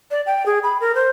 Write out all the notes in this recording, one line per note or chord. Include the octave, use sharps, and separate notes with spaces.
D5
G5
G#4
B5
A#4
C5